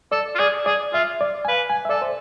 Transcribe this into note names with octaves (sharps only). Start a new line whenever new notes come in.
A4 D5
F4
G#4 D5
G#4 D5
F4 E5
D5
G#5
B4 F5
G#5
E5
A4 D5
C5